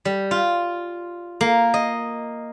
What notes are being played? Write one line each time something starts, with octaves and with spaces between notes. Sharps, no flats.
G3
F4
A#3
D#5